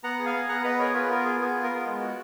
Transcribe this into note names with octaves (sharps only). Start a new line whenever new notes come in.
B3 F#5 A#5
G#4
F5 G#5
B3
B3 F#5 A#5
B3 B4 D#5
G#4 A#4 C#5
F4 G#4 B4
B3 A#4
G#4
B3 G#4
F4
A#4
B3
G#3
F#4